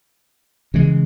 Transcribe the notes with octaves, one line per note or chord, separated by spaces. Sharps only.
C#3 E3 G#3